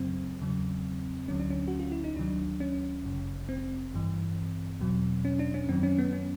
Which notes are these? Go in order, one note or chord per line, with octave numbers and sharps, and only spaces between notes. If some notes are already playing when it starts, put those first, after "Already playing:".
Already playing: F#2 C#3 F#3 C4
E2 C#3 F#3
D2 D3 F#3 C#4
D4
C#4
F#4
F4
E4
D#4
D2 C3 D#3 F#3 D4
C#4
G1 F#2 C#3
C4
A1 G2 E3
E2 B2 F#3
C#4
D4
C#4
F#2 D#3 F#3 C4
C#4
B3
C#4